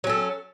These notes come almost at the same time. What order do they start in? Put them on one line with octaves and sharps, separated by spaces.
F#3 C#4 A4